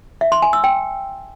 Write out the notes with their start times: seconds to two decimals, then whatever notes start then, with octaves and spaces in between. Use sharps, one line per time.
0.21 E5
0.32 C6
0.42 G#5
0.53 E6
0.64 G5